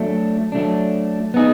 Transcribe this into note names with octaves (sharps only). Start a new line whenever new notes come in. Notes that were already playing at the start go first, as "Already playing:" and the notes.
Already playing: F#3 A3 D4
F#3 A3 D4
B3 D#4 G#4